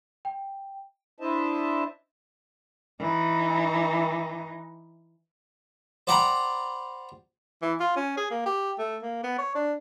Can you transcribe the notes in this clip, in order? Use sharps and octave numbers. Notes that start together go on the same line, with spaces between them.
G5
D4 E4 C5 D#5 E5 A5
E3 D#4
C5 D5 F#5 G5 A#5 B5
E3
F4
C#4
G#4
A#3
G4
A3
A#3
B3
C#5
D4